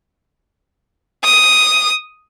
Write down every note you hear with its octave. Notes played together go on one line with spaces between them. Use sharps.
D#6